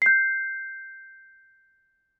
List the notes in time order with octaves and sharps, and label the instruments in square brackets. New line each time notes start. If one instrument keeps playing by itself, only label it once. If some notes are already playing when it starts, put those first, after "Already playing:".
[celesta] G6 C7